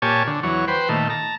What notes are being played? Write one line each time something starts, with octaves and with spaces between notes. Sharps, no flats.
A#2 G4 C#5 G#5 A5
D3
E2 F#3 C#5
B4 C5 G5
A#2 D#3 A3
A5 A#5